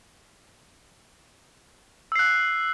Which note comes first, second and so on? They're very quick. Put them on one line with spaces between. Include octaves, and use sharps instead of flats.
E6 C7 F#6